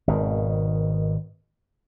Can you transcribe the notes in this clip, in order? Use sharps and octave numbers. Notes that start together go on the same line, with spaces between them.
G#1 B2 D#3